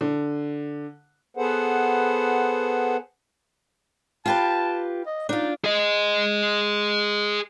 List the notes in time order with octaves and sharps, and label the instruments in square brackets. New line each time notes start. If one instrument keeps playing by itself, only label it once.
[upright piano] D3
[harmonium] B3 G#4 A4 B4 C5 F#5
[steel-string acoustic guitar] F4 G4 B4 [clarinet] A5
[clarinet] D#5
[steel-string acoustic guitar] D4 F4 [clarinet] D#4
[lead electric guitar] G#4 D#5